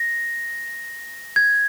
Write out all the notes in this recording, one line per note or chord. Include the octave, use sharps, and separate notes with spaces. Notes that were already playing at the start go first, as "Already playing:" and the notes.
Already playing: A#6
G#6